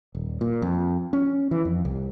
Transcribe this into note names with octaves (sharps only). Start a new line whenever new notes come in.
D#1
A#2
F2
C#4
E3
F2
C2